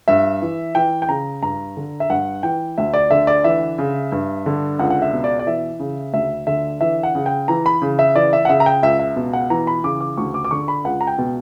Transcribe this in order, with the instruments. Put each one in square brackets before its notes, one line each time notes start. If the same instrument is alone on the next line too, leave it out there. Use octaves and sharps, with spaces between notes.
[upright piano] G2 E5
E3
E3 G5
G5
C#3 A#5
G2 A#5
D3
E5
G2 F#5
E3 G5
D2 E5
D5
D3 E5
D5
E3 E5
C#3
G2
D3
C#2 F#5
F#5
E5
B2
D5
D5
E3 E5
C#3
D2 E5
D3 E5
E3 E5
F#5
C#3
G5
E3 A#5
B5
C#3
E5
E3 D5
E5
F#5
C#3 E5
A#5
G5
C#2 E5
E5
B2
F#5
E3 A#5
B5
C#3 D6
D6
D2 C#6
D6
D6
D3 C#6
B5
C#2 F#5
A#5
G5
B2